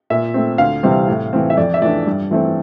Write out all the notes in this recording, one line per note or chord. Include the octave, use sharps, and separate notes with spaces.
A#2 E5
A3 C4
D2 F5
C3 E3 G3 C4
A2
E3 A3 C4
E5
F2 D5
E5
E3 A3 D4 D5
G2
E3 A3 C4